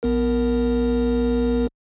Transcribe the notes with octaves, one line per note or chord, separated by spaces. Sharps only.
A#1 B3 A#4